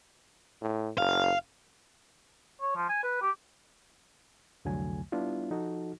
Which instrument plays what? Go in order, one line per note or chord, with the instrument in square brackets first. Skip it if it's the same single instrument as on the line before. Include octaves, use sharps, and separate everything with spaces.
[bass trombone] A2
[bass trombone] F#1 [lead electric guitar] F5
[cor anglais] C#5
F3
G#5
B4
G4
[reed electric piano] C2 F2 D3 F#3 A3 G#5
G3 B3 D4 E4 F4
F3 D#4 F#4 A4